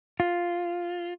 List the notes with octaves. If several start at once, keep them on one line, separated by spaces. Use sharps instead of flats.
F4